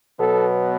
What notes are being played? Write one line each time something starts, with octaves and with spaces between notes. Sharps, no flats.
B2 F#3 B3 A4